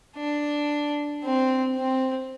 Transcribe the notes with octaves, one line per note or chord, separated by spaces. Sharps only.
D4
C4
C4